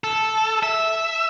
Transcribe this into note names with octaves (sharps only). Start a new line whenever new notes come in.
A4
E5